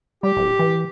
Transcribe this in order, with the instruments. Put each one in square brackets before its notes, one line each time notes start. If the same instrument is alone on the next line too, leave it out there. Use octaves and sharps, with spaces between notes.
[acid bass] G3 [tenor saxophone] G4
[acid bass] D1
E3